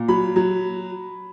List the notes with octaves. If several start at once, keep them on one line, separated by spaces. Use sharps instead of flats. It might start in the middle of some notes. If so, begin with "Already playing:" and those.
Already playing: A#2
F#3 B5
F#3